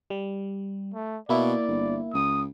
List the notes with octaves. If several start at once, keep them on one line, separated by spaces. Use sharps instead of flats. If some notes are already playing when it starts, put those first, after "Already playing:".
G3
A3
B2 A#3 E4 D5
G1
C#2 D#6